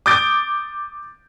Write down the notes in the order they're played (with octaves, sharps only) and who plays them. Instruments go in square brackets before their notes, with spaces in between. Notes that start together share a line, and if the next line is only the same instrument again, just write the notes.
[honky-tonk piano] D6 D#6 G6 A6 D7